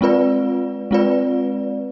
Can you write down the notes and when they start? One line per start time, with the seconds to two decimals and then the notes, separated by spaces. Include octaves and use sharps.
0.01 G#3 C4 F4 B4 D5
0.91 G#3 C4 F4 B4 D5